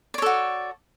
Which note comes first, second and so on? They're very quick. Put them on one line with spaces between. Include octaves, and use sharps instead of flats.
D5 C#5 A4 F#4